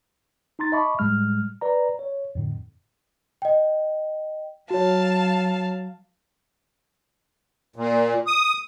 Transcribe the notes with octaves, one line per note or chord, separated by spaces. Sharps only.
D#4 A#5 C6 A6
D#5 E5 A5 B5 C#6 D6
A2 G3 G#3 F6
B4 D5 A#5
C#5
F2 A2 D3
D#5 G5
F#3 F#4 C#5 F5 A5
A#2
D#6